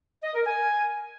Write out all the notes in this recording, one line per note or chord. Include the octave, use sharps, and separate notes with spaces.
D#5
A#4
G#5